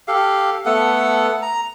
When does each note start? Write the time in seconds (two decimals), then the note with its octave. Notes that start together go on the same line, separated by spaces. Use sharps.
0.08 G4 A4 F5
0.65 A3 B3 A4 F#5
1.42 A#5